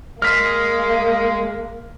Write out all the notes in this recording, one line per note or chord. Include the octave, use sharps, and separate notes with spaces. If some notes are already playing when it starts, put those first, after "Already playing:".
G#3 A#3 F6 B6